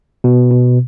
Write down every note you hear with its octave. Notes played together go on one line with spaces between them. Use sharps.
B2
B2